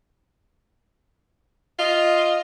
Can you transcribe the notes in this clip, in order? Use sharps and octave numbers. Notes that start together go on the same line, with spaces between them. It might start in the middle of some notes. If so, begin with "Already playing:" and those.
F4 D#5